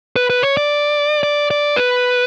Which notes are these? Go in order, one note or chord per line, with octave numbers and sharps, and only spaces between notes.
B4
B4
C#5
D5
D5
D5
B4